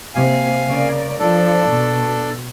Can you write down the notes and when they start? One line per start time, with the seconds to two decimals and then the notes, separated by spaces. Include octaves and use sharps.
0.15 C3 A#3 F5 G#5
0.65 C#3 A#4 D5
1.19 F3 D4 A4 D5
1.67 B2